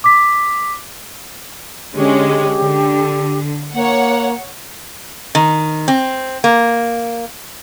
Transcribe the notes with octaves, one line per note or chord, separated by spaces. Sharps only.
D6 B6
D3 G#3 C#4 G4
D3
A#3 C#5 F#5
D#3
C4
A#3